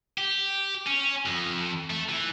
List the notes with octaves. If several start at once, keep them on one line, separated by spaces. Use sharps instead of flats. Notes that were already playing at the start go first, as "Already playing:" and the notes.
G4
C#4
F2
A3
E3